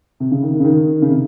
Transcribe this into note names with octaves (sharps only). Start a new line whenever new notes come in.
C3
C#3
D#3
D#3
C#3
D#3
C#3
C3